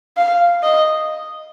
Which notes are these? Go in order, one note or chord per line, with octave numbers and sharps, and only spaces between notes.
F5
D#5